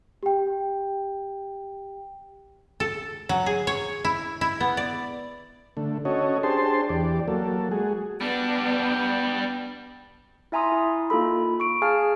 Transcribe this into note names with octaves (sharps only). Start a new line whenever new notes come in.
G4 G5
A4
F#3
G#4
C#5
E4
E4
B3
D5
D3 A3
C#4 F#4 A4 C#5 D#5
D4 G4 G#4 C5 A5 C6
E2 G4 D5
F#3 A#3 A4
G#3 F#4 G#4
G3 B3 D4
E4 E5 G#5 A#5 C6 D#6
E4
A#3 D#4 F4 A4 B5
C#6 D7
G#4 F5 G#5 A5 F6